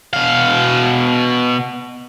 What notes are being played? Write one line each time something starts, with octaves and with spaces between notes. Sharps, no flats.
B2 F5